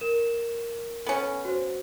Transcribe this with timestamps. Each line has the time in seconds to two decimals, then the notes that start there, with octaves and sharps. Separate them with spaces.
0.01 A#4 E7
1.06 B3 C#4 A4
1.45 F#4 C5